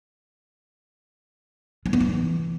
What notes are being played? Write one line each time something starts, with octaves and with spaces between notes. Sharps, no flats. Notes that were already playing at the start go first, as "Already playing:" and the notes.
G#3
B3
E3